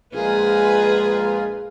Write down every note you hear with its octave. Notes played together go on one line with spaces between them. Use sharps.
A#1 G#3 F4 G#4 A#4 B4 F5